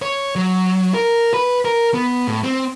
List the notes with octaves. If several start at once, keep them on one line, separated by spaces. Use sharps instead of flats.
C#5
F#3
A#4
B4
A#4
B3
A2
C4